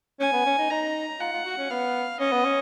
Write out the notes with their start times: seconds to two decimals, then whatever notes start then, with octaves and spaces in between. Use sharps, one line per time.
0.20 C#4 G#5
0.33 B3
0.46 C#4
0.58 D#4
0.70 D#4 A#5
1.20 F4 F#5
1.33 F4
1.45 F#4
1.58 C#4
1.70 B3 F5
2.20 C#4 D#5
2.32 B3
2.45 C#4